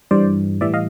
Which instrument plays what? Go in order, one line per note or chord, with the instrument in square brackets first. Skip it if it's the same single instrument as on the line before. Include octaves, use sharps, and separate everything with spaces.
[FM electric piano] G2 E3 G3 C5 D5
A2 E3 G3 D5 E5
D#5 F5